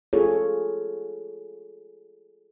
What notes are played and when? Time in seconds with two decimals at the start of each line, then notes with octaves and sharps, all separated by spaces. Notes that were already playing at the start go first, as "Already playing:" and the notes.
0.13 F4 G#4 A4 C#5